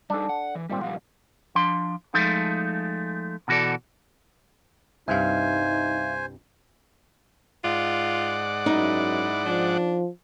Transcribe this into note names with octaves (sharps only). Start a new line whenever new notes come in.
G3 D4 D#4 A4
F#5
E3
G#1 A#2 G3 C4
A#2 F3 G3 F4 F#5
F3 D4 C6
F3 G#3 A3 D#4
B2 E3 F#4 A4 D5
C2 G2 D#4 C5 E5 F5 G#5
G#2 F4 D5 F#5
F#2 D#4 E4
F3 D4